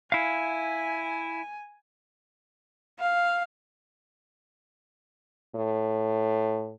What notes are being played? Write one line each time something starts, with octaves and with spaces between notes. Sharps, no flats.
E4 F5 G#5
F5
A2